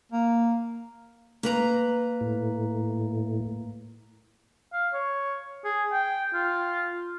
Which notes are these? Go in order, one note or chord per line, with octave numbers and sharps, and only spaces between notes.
A#3
A#3 B4 A#5
A2
F5
C#5
G#4
G5
F4